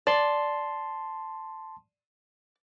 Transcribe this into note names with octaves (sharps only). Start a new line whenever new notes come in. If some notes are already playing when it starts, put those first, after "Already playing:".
D5 A5 C6